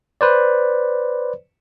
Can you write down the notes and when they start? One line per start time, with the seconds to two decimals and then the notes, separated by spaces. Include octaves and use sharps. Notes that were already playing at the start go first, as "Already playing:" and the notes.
0.21 B4 C5 D5